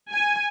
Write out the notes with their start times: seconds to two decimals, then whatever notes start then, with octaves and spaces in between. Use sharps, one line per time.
0.11 G#5